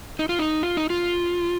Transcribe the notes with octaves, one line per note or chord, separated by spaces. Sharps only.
D#4
F4
D#4
F4
D#4
F4